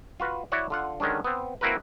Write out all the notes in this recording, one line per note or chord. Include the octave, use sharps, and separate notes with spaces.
F4 F#4 B4
E4 F#4 C#5 D5 E5 F#5
D3 F4 F#5
D3 D#3 G#3 C#4 D4
B3 C4
A#3 C4 E4 F#4 A#4 B4